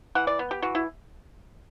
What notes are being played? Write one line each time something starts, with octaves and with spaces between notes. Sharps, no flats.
E3 F#5
D5
B3
G4
E3 F#4
E4